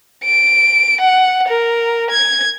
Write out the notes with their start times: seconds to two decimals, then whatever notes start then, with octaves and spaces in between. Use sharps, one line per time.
0.24 D7
1.01 F#5
1.48 A#4
2.10 G#6